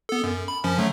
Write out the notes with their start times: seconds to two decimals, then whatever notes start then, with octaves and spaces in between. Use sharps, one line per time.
0.09 B3 A4
0.24 F#2
0.48 B5
0.64 F#2 F3 C#4
0.78 D3 F#3 A3